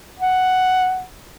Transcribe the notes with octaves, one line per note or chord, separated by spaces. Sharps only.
F#5